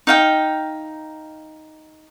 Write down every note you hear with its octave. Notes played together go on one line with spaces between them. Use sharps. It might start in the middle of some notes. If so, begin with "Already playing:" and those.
D#4 F5 G5